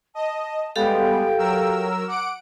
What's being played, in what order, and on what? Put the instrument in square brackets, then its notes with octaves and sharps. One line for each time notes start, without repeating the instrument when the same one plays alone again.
[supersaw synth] D#5 [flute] A5
[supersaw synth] G3 G#3 B3 [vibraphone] G4 A4 F5 [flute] G5
[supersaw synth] F#3 A#4 E6
[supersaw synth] F#5 D7 [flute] D6